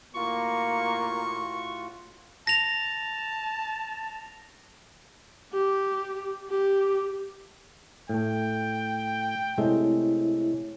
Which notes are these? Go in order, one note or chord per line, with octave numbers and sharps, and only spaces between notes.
A2 A#3 F4 F#4 C#6
A5 A#6 F7
G4
G4
A2 A3 G5
C3 G#3 A3 E4 C#5